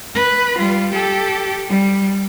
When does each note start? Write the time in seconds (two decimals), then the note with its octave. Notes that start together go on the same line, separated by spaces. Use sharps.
0.15 B4
0.58 G3 F4
0.91 G4 A4
1.69 G3